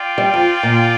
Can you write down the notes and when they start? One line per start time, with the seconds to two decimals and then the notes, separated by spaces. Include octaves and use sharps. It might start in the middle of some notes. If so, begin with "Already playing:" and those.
Already playing: F4 D5 G5
0.18 G3
0.34 F2
0.63 A#2